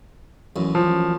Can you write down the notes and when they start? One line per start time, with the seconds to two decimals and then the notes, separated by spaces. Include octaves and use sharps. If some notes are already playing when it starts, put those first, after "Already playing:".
0.56 A1 F#2
0.75 F3